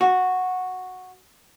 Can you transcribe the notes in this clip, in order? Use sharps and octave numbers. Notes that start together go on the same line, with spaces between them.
F#4